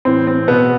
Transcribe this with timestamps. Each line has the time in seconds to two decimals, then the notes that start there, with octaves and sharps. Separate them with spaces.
0.05 A2 E3 C4
0.27 C4
0.48 B2 B3